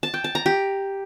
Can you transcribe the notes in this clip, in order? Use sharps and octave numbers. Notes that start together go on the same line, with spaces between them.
A5
G5
A5
A#5
G4